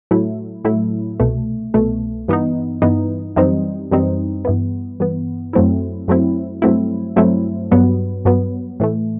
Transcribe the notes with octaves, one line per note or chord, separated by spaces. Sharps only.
A2 F#3 A3 E4
A2 F#3 A3 E4
C2 B2 A3
C2 B2 A3
G2 E3 B3 D#4
G2 E3 B3 D#4
F#2 E3 G3 C4 D#4
F#2 E3 G3 C4 D#4
G2 E3 B3
G2 E3 B3
F#2 F#3 A3 C4 E4
F#2 F#3 A3 C4 E4
G2 F#3 A3 C4 E4
G2 F#3 A3 C4 E4
G2 F#3 B3
G2 F#3 B3
A2 E3 A3